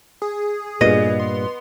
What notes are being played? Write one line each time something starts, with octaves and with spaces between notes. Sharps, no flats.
G#4
G2 A#2 B3 D#5
C6